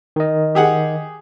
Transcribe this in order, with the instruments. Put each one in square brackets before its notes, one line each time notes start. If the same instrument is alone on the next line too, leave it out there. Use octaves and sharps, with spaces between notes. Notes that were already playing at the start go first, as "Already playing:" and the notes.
[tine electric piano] D#3 D#5
[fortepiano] G4 G#4 F#5